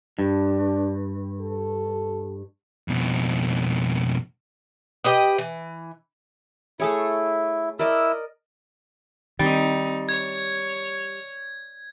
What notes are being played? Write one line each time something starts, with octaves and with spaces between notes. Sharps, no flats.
G2 D4
A4
F2 B2
G4 B4 D#5
E3
A3 E4 G#4 C#5
E4 A#4 D5 D#5 E6
D#3 G3 C4 D#4
C#5 G#6